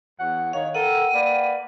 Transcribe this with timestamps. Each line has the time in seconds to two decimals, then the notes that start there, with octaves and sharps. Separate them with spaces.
0.19 E2 C#5 F#5
0.53 D#3 C#5 F5
0.75 A4 A#4 F#5 G5 D#7
1.14 A#3 B4 D5